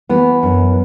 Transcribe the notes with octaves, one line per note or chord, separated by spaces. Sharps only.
E3 B3
F#2